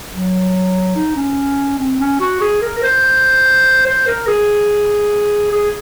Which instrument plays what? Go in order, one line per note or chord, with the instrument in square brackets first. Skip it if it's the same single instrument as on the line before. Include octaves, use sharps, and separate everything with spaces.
[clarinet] F#3
D#4
C#4
C4
C#4
F#4
G#4
A#4
A#4
C5
C5
A#4
G#4
G#4